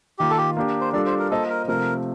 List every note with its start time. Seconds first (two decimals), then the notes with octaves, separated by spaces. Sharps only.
0.19 D#3 A#3 F4 G4
0.30 A4
0.38 G4
0.57 A#3 D4 G4
0.81 C5
0.93 G3 D4 F4 A4 D5
1.06 C5
1.19 A#4
1.31 A#3 F4 A4 C5 D#5
1.49 A#4
1.68 C3 F3 A3 A#4